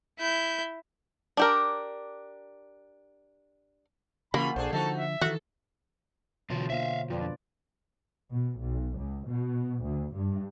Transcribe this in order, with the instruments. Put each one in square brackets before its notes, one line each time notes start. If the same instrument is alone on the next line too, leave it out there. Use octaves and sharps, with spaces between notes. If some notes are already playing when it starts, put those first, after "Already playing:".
[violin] E4 G6
[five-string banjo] D4 G4 A#4
[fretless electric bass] C#3 [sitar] E3 F4 F#4 [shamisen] A#3 [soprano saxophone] B5
[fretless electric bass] A#1 [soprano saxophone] D4 [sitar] G#4 A4 C5
[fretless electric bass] D3 F3 [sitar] D#4 F#4 [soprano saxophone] A4
[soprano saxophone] E5
[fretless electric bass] D#3 E3 [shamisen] F#4 [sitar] A4
[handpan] B2 D3 C#5 [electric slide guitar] E3 F4 F#4
[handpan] A#3 F4 C5 [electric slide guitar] E5 F5
[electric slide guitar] F2 [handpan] F4 B4 D5
[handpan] D4
[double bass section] B2
B1
C#2
B2
D2
G2